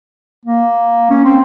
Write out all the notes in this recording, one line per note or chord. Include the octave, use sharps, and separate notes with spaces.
A#3
C#4
C4